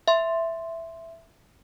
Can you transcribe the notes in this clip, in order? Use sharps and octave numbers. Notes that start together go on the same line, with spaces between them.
E5 C6